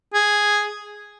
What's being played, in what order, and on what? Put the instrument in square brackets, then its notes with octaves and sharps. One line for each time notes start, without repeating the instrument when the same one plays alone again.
[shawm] G#4